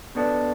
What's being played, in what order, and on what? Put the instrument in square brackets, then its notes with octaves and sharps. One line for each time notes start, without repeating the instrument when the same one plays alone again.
[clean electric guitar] B2 B3 D4 A4